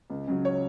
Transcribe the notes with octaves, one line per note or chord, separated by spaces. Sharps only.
C#2
C#3 F#3
C#5